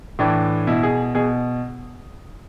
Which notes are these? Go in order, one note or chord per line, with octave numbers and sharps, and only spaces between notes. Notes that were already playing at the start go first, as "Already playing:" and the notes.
A2 E3 D4
B2 E4
G#4
B2 G#4